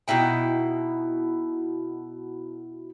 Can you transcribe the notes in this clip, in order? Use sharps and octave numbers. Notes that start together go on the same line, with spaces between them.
B2 D#4 E4 G5